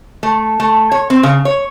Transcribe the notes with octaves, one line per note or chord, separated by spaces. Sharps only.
A3
A3
C#5
C4
C#3
C#5